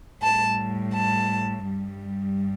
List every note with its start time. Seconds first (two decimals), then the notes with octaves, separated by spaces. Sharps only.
0.22 A2 G3 A5
0.95 A5
1.66 G2 G3